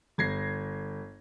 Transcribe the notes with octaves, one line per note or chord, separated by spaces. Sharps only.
G1 G#6 A#6 C7